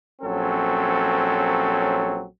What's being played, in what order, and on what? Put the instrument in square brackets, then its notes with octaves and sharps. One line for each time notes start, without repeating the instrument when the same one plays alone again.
[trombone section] A#1 F#3 C4 C#4 A4